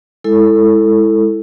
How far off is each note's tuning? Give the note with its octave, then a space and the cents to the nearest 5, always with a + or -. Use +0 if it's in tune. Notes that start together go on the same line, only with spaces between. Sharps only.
G#3 +0 E4 +0 A4 +10